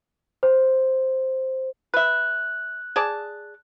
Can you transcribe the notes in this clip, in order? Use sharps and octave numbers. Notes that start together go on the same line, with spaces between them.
C5
B4 E5 F#6
G#4 D5 A5